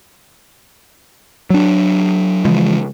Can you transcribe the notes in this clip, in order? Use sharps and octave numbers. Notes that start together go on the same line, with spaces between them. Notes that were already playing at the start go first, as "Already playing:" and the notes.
F#3 D4
C#3 E3 F3 G#3